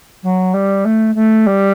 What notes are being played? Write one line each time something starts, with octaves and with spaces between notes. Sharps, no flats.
F#3
G3
A3
A3
G3